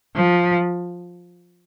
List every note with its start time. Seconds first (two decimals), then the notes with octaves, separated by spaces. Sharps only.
0.15 F3